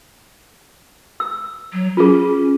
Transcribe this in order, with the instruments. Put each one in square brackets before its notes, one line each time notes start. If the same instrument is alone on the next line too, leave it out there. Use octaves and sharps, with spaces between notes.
[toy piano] E6
[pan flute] F#3
[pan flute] C#4 [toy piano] F4 G#4